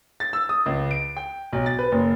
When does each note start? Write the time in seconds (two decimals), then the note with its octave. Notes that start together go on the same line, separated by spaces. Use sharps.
0.20 A6
0.33 E6
0.49 D#6
0.66 C#2
0.91 D7
1.17 G5
1.52 B1
1.66 A6
1.79 B4
1.92 F#1